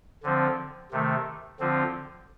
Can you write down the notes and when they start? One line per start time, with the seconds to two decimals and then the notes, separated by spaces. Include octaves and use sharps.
0.23 D3 F3 C4
0.92 C3 D#3 A3
1.60 D3 F3 C4 F4